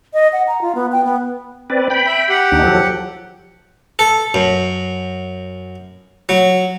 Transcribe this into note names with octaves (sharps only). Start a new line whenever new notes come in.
D#5
F#5
A#5
F4
B3
G5
B3
C4 B4 D5
G5 B5
E5
G4 F#5
D#2 D4 D#4
F3 F#3 A4
A4
F#2
F#3